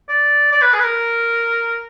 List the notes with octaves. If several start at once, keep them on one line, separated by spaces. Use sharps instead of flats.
D5
D5
B4
G#4
B4
A#4